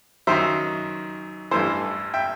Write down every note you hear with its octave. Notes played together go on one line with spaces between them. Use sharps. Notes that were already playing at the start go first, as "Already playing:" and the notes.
F#2 D#3 F#3 C5 E5
A1 G2 E3 A4 C5
E5 G5